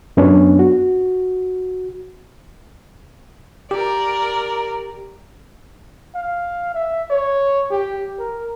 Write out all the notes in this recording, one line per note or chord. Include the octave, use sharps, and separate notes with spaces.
F#2 B3 C#4 D4
F#4
G4 A#4 D5
F5
E5
C#5
G4
A#4